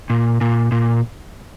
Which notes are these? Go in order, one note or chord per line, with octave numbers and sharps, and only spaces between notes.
A#2
A#2
A#2